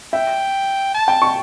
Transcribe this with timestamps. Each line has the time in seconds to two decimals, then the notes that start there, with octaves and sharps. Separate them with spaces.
0.13 E5 G5
0.95 A5
1.08 G5
1.22 C#6